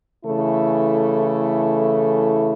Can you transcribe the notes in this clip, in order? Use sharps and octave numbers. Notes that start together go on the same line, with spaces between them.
C#3 E3 A3 E4 A4